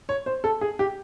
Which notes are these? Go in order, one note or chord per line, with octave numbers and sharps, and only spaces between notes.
C#5
C5
A4
G#4
G4